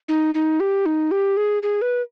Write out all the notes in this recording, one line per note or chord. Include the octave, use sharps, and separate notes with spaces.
D#4
D#4
G4
D#4
G4
G#4
G#4
B4